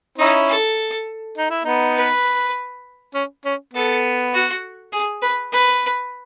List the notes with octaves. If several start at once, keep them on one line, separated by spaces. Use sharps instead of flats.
C#4 D#4 E4
A4
D#4
E4
B3 D#4
B4
C#4
C#4
B3 A4
F#4
G#4
B4
B4